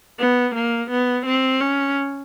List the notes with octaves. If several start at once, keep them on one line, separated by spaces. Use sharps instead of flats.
B3
A#3
B3
C4
C#4